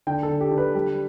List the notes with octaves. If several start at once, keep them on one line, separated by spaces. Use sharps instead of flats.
D3 G5
A4
D3
G4
D3
B4
G3